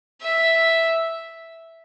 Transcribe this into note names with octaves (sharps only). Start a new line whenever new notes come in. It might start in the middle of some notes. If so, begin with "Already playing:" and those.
E5